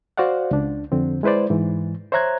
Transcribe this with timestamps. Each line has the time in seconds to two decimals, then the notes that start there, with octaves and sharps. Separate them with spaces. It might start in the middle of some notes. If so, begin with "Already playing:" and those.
0.17 F#4 C5 D5 F5 F#5
0.51 C#2 D4
0.92 F2 D3 C4
1.23 G#3 E4 B4 C5 D5
1.50 G#2 E3
2.12 C5 C#5 E5 A#5 F#6 G#6